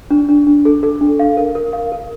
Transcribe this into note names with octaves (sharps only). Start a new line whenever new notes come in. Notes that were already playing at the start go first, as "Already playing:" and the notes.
D4
D4
D4
A4
A4
D4
F5
A#4
A#4
F5
A#4